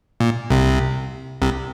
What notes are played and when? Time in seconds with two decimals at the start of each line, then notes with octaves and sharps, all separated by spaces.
0.20 A#2
0.50 C2 C3
1.42 C2 C3